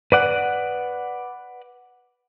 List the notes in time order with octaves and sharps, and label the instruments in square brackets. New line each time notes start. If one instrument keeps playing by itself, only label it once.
[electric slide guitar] B4 D5 F#5